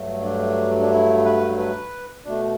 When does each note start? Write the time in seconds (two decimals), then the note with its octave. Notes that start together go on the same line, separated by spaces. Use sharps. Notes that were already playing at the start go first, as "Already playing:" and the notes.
Already playing: G2 F#3 A3
0.23 D4
0.81 D4
0.91 E4
1.25 B4
1.58 B4
2.25 B2 A3 D4